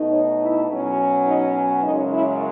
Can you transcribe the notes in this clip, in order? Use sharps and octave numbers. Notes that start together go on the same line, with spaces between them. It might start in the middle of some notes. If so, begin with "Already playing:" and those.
Already playing: B2 A3 D#4
C#5
E4
B2 F#3 C#4
D#4
F#2 C#3 G#3 C#4 D#4
E4